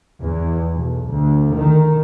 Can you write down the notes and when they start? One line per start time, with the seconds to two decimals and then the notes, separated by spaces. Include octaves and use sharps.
0.21 E2
0.72 B1
1.08 D2
1.53 D#3